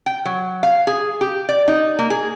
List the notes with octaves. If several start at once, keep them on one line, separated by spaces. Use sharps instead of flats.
G5
F#3
F5
G#4
G4
D5
D#4
A#3
G#4